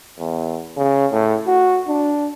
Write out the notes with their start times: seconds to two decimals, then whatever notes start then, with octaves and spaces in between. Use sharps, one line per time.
0.19 E2
0.77 C#3
1.12 A2
1.47 F#4
1.88 D4